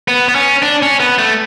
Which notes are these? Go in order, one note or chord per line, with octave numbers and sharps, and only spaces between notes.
B3
B3
C#4
D4
C#4
B3
A3